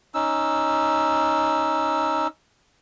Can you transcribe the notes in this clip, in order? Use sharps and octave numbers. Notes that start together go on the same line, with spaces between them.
C#4 D#4 E6